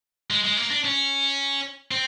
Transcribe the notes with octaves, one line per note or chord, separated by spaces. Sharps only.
G#3
G#3
A#3
D4
C#4
C4